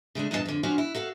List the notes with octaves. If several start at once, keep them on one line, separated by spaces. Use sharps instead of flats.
C#3 G#3 A3 D4
E2 G2 A#2 E4 D#5 A5
F2 D3
F3 C#4 D4 F4 F#4 F5
E4
F#4 A4 F5